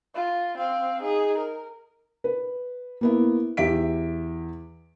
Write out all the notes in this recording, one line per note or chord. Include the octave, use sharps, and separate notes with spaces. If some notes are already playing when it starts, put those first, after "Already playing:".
F4
C4 F5
D#4 G#4
A#4
B4
A#3 B3 E4
E2 G4 E5 B6 D7